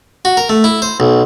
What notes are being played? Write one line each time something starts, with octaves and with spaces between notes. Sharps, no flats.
F#4
A#4
A3
E4
C5
B1